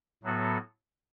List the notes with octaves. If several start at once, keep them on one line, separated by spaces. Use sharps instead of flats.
A2 F#3 B3 F#4 A4